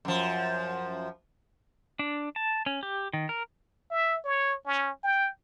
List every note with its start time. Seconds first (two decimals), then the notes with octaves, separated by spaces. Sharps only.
0.05 F#2 F3
1.99 D4
2.36 A5
2.66 C#4
2.83 G4
3.13 D#3
3.29 A#4
3.91 E5
4.25 C#5
4.66 C#4
5.04 G5